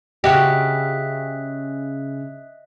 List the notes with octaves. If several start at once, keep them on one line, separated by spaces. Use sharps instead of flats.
C#3 F#4 G4 D#5 E5 F#6